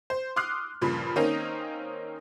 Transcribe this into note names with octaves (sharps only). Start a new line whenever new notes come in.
C5
C6 D6 D#6 F6 F#6 C7
G2 A#2 C#3 F3 B5
D#3 A#3 C4 C#4 D#4